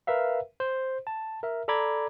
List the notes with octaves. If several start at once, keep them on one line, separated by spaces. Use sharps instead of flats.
A#4 B4 E5 F5
C5
A5
A#4 E5
A4 D5 A#5 B5 D6 G#6